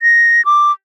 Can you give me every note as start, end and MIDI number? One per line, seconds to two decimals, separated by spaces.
0.02 0.44 94
0.45 0.72 86